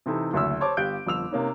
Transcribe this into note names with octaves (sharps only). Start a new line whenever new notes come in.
C3 E3 C4 D#4 E4 A4
F#1 D2 E5 E6
C5 C#5 A5 D6
G1 G4 F5 F#6 G6 D7
G1 F2 E6 F7
C3 A#3 C#4 D#4